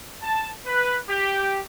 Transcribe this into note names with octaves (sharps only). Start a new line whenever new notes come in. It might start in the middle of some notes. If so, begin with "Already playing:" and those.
A5
B4
G4